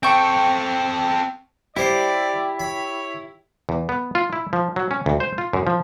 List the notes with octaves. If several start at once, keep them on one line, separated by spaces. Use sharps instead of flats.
C4 A4 G5 C#6
G3 E4 G4 C5 D5
C#5 B5
E2
B3
F4
E4
F3
F#3
C#4
D2
C5
F4
F#2
F3